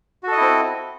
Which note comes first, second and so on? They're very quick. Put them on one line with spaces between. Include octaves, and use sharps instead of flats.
F#4 A4 D#5 E4 C4